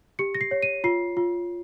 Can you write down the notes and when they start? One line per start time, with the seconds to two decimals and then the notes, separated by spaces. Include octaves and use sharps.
0.19 G4 C#7
0.35 A#6
0.41 C7
0.51 C#5
0.63 D#7
0.84 F4 C7
1.17 F4